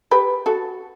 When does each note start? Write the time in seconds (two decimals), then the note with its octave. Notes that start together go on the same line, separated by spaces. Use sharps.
0.11 G4 B4
0.46 F#4 A4